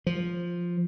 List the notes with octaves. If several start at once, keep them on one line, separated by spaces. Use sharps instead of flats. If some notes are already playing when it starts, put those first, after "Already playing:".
F3